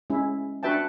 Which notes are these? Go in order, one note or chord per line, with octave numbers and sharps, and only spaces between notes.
G#3 C#4 E4
D4 F#4 B4 E5 G5 A5